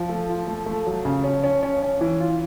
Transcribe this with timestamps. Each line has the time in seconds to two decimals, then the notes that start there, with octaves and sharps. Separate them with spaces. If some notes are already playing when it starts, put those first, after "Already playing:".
Already playing: F3
0.09 A3
0.29 F4
0.48 A3
0.66 A3
0.87 F#3
1.05 C#3
1.24 C#4
1.44 C#4
1.63 C#4
1.82 C#4
2.01 E3 C#4
2.20 F4